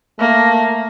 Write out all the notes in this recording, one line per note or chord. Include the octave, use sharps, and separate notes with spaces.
A3 A#3